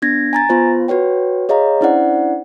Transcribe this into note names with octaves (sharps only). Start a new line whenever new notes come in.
B3 D4 G#6 A#6
G#5 A#5 A6
B3 F4 C5
F#4 B4 C#5 G5
G#4 C#5 D#5 F5 A#5
C#4 D4 E4 C5 D5 F#5